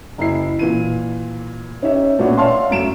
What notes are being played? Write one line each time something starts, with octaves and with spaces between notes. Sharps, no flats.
F#1 E4 C7
A#2 E3 D#7
C#4 D#4 G4 E5
A#2 A3 B3 C#4 D4 F#4
C#5 D5 E5 F5 A5 C6
F#2 A3 D7 E7